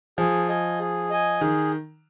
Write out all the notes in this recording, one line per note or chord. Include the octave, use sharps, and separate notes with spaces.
F3 G#4
D#5 G#5
G#4
D#5 G#5
D#3 G#4